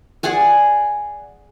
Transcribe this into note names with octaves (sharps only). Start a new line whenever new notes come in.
G#4 D5 F#5 G#5